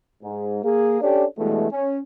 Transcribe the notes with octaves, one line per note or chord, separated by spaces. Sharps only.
G#2
A#3 G#4
C#4 D4 G4 A4 C#5 D5
G2 B2 E3 G#3 A3
C#4